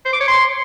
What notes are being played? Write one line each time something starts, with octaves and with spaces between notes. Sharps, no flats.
C5
D6
C#5
C6